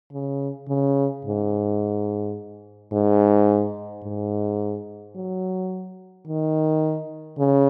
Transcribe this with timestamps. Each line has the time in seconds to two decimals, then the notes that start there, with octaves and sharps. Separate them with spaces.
0.12 C#3
0.68 C#3
1.25 G#2
2.92 G#2
4.03 G#2
5.16 F#3
6.27 D#3
7.38 C#3